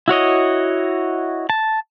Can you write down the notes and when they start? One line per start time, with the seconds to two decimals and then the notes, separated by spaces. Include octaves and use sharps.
0.08 E4 F#4 C#5 D#5
1.50 A5